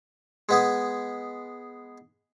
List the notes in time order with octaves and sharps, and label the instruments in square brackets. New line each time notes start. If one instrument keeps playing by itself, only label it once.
[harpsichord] G#3 B3 G#4